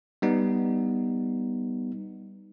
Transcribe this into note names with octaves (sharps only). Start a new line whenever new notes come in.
G3 B3 D#4